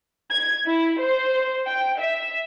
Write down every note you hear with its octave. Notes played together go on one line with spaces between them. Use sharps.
G#6
E4
C5
G5
E5